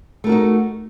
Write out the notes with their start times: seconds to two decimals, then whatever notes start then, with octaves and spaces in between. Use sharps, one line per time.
0.24 A3
0.27 A#4
0.29 F#4
0.32 D#4